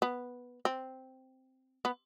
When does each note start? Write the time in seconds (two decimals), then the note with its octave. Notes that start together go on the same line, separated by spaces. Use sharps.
0.02 B3
0.65 C4
1.85 B3